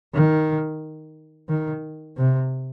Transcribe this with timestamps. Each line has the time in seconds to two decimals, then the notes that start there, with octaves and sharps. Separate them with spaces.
0.14 D#3
1.49 D#3
2.17 C3